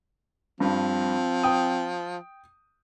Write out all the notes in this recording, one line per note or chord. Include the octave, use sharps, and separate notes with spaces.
G2 F3 C4
G5 D#6